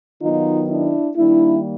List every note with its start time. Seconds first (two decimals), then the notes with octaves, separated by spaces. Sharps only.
0.22 D#3 F#3 B3 D#4 F4
0.69 D4 E4
1.16 D#3 G3 A#3 D4 E4